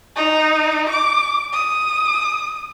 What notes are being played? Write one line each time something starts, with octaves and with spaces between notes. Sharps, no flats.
D#4
D6
D#6